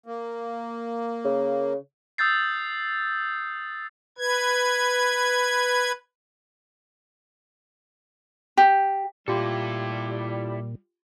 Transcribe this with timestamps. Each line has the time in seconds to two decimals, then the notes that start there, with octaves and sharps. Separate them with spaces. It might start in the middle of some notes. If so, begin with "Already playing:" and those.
0.06 A#3
1.25 C#3
2.18 D#6 E6 G6 A6 C7
4.18 B4 G#6
8.57 G4
9.28 A#2 G3 E4 F4 G4 A4